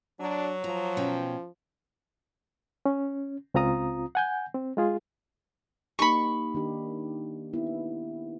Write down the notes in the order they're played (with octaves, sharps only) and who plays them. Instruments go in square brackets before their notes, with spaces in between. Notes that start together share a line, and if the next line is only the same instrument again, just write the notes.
[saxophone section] F#3 [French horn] D4
[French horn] F3 [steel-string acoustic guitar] A#5
[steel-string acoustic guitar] B2 C#4 G5
[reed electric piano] C#4
C#2 C4 F4 A#5 D#6
F#5 G#5 G6
C4
G#3 F4 G#4
[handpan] A#3 D#4 G4 [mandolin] B5 C#6
[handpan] D#3 D4 G4
B3 E4